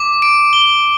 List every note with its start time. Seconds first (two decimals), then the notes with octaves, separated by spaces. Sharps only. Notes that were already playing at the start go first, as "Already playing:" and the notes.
Already playing: D6
0.22 D7
0.53 G7